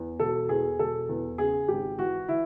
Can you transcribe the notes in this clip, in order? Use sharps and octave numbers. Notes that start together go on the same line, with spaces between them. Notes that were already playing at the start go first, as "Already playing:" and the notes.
Already playing: E2
E1 A4
E2 G#4
E1 A4
E2
C#3 G#4
G#1 G4
E3 F#4
E3 E4